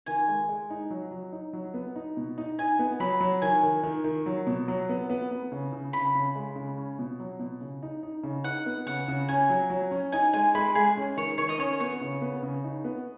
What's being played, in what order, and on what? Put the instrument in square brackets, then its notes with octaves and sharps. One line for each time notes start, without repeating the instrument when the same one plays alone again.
[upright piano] D#3 [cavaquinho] G#5
[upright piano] G#3
G#3
D#4
F#3
F#3
D#4
F#3
B3
D#4
B2
D#4
[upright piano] D#4 [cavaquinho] G#5
[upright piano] B3
[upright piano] F#3 [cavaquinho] B5
[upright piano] F#3
[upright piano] D#3 [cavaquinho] G#5
[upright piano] D#3
D#3
D#3
F#3
B2
F#3
B3
B3
B3
C#3
C#3
[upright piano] C#3 [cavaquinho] B5
[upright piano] C#3
G#3
C#3
C#4
B2
F#3
B2
C#3
D#4
D#4
C#3
[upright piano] D#4 [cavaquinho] F#5
[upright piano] B3
[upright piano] C#3 [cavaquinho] F#5
[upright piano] C#3
[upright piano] C#4 [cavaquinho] G#5
[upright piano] F#3
F#3
C#4
[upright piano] D#4 [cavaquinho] G#5
[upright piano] G#3 [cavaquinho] G#5
[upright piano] G#3 [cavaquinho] B5
[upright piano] G#3 [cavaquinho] G#4
[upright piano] C#4
[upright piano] D#3 [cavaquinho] C#5
[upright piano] D#3 [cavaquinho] C#5
[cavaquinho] D#5
[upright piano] C#4 [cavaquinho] C#5
[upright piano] B3 [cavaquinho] C#5
[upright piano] C#3
B3
C#3
D#4
B3